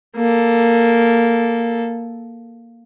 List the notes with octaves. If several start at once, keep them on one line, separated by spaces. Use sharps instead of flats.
A#3 A4